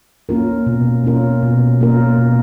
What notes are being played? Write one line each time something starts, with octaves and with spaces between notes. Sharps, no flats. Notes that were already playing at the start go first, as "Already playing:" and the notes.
A#3 C#4 F4 A#4
B2
A#3 C#4 F4 A#4
B2
A#3 C#4 F4 A#4
B2